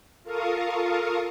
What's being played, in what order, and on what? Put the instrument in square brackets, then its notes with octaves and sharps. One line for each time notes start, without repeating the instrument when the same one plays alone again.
[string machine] F4 A4 A#4 F5 C#6 D#6